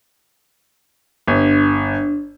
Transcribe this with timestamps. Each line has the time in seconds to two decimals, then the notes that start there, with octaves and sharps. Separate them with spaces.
1.28 G1 D4